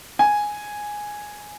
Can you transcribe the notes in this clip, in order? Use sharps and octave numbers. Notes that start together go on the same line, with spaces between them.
G#5